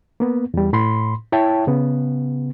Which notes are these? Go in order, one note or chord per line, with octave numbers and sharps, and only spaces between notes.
A#3 B3
E2 G3
A2 B5 C6
E4 C#5 E5 G5 A5
C#3 B3